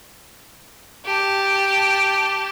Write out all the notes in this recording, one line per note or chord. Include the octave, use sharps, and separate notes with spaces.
G4 A5